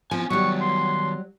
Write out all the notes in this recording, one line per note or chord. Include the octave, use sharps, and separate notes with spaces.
F3 B3 C4 G#5
D#3 F#3 G3 B3 C#6
C6